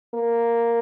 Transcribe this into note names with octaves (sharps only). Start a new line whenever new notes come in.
A#3